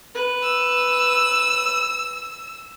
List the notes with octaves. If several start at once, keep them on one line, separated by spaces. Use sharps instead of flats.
B4
E6